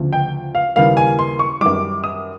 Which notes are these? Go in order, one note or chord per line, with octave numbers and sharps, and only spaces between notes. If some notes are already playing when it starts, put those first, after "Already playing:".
Already playing: D2 C#3 F3
G5
F5
D#2 C#3 E3 G3 A#3 F5
G#5
C6
C#6
F#2 D#3 G3 D6
D#6